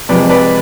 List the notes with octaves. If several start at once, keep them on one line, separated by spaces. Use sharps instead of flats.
C3 F3 G#3 B4 D5
B4 D5